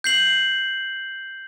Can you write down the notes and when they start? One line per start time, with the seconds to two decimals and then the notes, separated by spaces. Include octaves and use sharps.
0.04 G6 C7 F#7